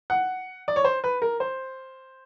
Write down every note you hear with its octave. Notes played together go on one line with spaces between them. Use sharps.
F#5
D5
C#5
C5
B4
A#4
C5